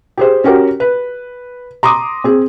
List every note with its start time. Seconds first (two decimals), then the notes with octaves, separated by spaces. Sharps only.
0.18 G4 G#4 C5
0.44 C#4 F#4 G4 A#4
0.80 B4
1.83 A#5 C6 D6 D#6
2.24 C4 G#4